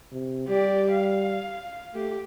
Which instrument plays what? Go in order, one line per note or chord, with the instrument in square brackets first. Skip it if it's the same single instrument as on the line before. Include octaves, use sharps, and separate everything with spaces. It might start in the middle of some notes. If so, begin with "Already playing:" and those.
[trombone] C3
[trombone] G3 [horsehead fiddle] G4 D5
[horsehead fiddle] F5
[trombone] A3 [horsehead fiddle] G4